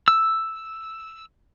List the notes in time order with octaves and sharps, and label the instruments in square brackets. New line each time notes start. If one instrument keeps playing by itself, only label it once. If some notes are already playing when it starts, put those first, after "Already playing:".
[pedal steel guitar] E6